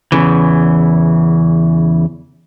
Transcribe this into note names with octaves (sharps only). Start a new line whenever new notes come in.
E2 G2 C#3 E3